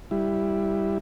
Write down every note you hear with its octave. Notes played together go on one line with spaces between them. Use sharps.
G3 E4